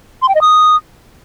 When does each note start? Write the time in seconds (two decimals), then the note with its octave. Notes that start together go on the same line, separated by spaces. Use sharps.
0.22 C6
0.29 G5
0.35 D#5
0.41 D#6